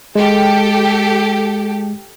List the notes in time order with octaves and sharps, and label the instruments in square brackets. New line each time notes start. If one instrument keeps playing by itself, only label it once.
[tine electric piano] G#3 [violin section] G4 A4